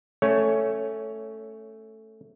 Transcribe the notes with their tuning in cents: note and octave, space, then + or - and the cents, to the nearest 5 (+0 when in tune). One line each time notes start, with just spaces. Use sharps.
A3 +0 C#4 -5 C#5 +10